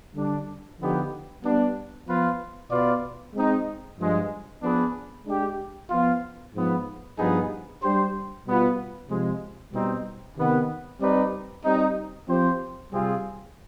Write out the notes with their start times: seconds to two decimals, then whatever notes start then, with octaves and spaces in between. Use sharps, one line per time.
0.16 D3 G3 D4
0.80 D3 F3 B3 D#4 G4
1.43 G3 B3 D4
2.07 F3 B3 F4 B4
2.70 B2 B3 F4 B4 D5
3.35 G#3 C4 D#4
3.98 G2 F3 G#3
4.62 F3 B3 D4 G#4 B4
5.27 G#3 D4 G4
5.90 F3 B3 F4
6.54 G#2 F3 B3
7.18 G2 F3 B3 D#4 G#4
7.81 G3 D4 G4 C5
8.46 B2 G3 B3 F4
9.10 C3 F3 G#3
9.73 B2 G3 C4 D#4
10.37 C3 D#3 B3
11.00 G3 C4 D#4 B4 D5
11.64 G3 C4 D#4
12.28 F3 C4 G4 C5
12.92 C3 G3 C4 F4 G#4